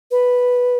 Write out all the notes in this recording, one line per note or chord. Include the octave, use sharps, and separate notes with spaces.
B4